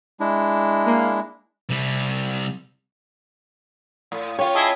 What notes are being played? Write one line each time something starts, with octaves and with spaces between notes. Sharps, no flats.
G#3 D4 E4
A#3
C3 G3
A2
C#4 F4 C#5 G5
E4 G#4 D#5 A5 E6 B6